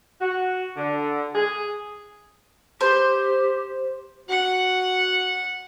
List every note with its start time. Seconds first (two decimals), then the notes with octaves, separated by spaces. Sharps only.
0.21 F#4
0.77 D3
1.34 G#4
2.81 G4 C5
4.29 F#4 F#5